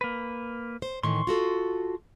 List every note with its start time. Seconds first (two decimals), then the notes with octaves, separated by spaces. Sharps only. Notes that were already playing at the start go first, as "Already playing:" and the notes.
0.01 A#3 B4
0.82 C5
1.03 A2 D#3 E3 C6 C#6
1.27 F4 F#4 A4